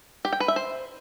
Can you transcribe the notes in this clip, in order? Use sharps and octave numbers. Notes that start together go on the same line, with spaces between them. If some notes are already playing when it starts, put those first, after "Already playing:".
G4
G5
B4
E5
C5